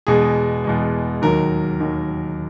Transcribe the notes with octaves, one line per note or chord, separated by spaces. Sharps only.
E2 B2 G#3 G#4
E2 B2 G#3
D#2 D#3 F#3 A#4
D#2 D#3 F#3